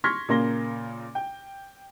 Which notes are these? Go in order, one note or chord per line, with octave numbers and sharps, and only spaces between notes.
C6 C#6 F6 G#6 A#6 B6
A#2 C#3 A#3 C6 A#6 G7
G5